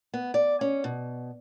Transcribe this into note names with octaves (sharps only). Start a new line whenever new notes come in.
B3
D5
C#4
B2